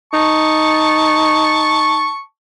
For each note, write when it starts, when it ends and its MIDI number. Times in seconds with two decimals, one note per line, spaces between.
0.13 2.09 63
0.13 2.21 81
0.13 2.21 85